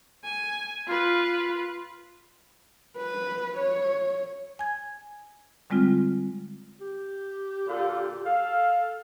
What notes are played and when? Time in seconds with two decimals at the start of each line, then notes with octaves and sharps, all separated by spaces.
0.24 G#5
0.87 F4 B4
2.97 B4
3.57 C#5
4.59 G#5 G#6
5.70 D3 G3 G#3 C4 F4
6.81 G4
7.67 A#2 D3 F4
8.25 A4 F5